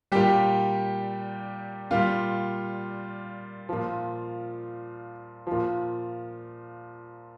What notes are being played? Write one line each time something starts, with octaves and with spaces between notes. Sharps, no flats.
A#2 G3 G4
A#2 G3 F4
A#2 F3
F3
A#2